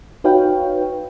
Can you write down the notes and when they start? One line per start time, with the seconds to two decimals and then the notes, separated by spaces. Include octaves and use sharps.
0.24 D#4 F#4 B4 C#5 F5 G5